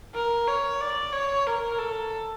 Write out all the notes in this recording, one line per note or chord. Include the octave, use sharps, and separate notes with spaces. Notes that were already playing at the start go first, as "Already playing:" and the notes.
A#4
C#5
D5
C#5
A#4
A4